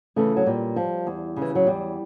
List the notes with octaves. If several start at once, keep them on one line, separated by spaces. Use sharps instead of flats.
C#3 E3 A3
F#3
A#2 G3
F3
E2
C#3
E3
F#3
E2 G3